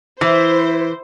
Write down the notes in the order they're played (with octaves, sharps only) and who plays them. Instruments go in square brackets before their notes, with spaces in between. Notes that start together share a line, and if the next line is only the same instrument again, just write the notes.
[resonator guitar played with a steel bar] E3 [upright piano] E4 [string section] C5